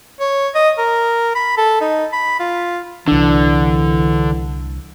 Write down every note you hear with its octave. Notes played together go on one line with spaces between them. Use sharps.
C#5
D#5
A#4
B5
A4
D#4
B5
F4
C2 D3 E3 D4